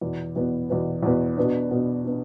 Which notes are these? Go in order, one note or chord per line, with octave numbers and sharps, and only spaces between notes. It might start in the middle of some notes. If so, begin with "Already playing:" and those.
E2 B2 B3
E2 B2 B3
E2 B2 B3
E2 B2 B3
B2 B3 D4
B2 B3 D4
B3 D4